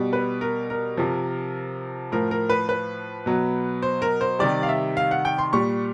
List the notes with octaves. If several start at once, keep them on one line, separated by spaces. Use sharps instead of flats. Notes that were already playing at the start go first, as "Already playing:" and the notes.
Already playing: B2 G3
B4
A#4
A#4
C3 F3
A2 F3 A#4
A#4
B4
B4
B2 F#3
C5
A#4
C5
C3 D#3 G3 D5
F5
E5
F5
F#5
G5
C6
A#2 G3 C#6